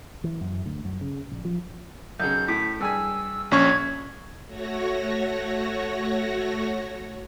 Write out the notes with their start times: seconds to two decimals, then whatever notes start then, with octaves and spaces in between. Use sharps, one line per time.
0.24 E3
0.41 F#2
0.66 D2
0.85 F#2
1.01 C#3
1.32 A#1
1.45 F3
2.20 B1 C#3 G6
2.48 A2 B6
2.80 G2 G#4 G#5 E6
3.51 A#1 C#4 C#6 G#6
4.46 A3 F#4 C#5 A#6